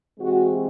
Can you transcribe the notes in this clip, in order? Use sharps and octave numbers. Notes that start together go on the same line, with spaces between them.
C3 E3 G#3 C4 F#4